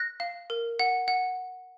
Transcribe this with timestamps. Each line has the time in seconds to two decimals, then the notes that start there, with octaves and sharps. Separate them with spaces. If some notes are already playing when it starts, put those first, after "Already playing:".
Already playing: F#6 A#6
0.20 F5
0.50 A#4
0.79 F#5
1.08 F#5